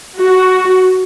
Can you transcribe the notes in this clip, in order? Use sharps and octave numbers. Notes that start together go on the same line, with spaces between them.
F#4